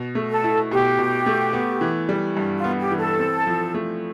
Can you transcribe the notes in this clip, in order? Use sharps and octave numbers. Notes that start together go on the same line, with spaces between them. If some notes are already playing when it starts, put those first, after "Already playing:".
Already playing: B2
A3
A4
E4
B2 G4
B2
A3
B3
E3
G3
G2
F4
B3
G4
E3
A4
C4
F3
A3